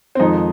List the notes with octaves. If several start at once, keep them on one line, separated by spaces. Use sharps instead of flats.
C4
F2 D#3 G#3 D#4